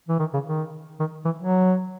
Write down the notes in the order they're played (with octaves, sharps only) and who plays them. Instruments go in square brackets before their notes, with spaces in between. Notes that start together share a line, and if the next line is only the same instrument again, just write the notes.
[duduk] E3
D#3
C#3
D#3
D#3
E3
F#3